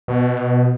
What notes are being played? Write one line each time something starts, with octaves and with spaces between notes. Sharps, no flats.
B2